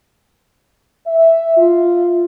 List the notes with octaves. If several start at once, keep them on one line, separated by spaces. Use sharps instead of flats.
E5
F4